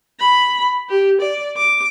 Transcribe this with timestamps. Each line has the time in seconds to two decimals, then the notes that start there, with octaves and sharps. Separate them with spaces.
0.20 B5
0.90 G4
1.21 D5
1.57 D6